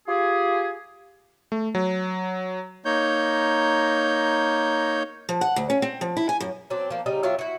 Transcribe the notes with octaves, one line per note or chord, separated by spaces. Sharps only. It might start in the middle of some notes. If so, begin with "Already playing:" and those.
F4 G4 G#4
A3
F#3
A#3 D#4 C#5 G6
F3
F#5
D2
C#4
C4
F3
E4
G#5
F#2
F#3 C4 D4
F3 A#3
C#3 G3 D#4
F#3 F4 G4 E5
E4 F#4